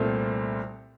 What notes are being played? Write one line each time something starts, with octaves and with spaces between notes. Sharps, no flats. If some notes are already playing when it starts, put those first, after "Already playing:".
Already playing: C2 A#2 A3 C4